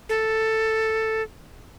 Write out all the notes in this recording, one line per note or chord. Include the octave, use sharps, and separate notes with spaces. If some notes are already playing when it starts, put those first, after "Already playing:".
A4